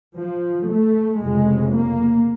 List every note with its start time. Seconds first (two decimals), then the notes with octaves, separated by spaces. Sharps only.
0.17 F3
0.69 A3
1.22 F1 F2 C#3 G#3
1.74 A#3